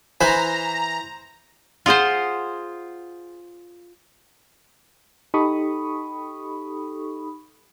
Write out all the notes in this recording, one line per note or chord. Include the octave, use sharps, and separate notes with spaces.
E3 B4 C5 G#5 A#5 B5
F4 G#4 C5 D#5 F#5
D#4 G4 A4 B5 C#6 D#6